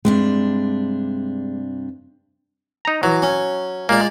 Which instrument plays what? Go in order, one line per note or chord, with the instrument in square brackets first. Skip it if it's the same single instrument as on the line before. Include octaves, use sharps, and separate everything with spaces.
[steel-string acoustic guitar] G2 C3 D4 [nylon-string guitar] G#3
[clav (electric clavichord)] D#4 A#5
[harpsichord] E3 [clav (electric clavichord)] F#3
[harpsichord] C#4
[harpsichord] G#3 F4 D5 [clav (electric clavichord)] A#3